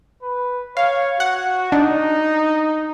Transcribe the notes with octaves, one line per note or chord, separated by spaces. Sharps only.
B4
C#5 F5
F#4 F#5
D4 D#4